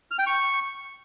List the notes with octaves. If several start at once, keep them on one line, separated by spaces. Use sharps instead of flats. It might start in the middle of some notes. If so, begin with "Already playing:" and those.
F6
G5
C#6